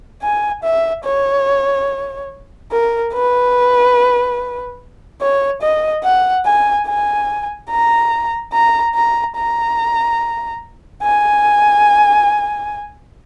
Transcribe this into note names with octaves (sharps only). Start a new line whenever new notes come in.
G#5
E5
C#5
A#4
B4
C#5
D#5
F#5
G#5
G#5
A#5
A#5
A#5
A#5
G#5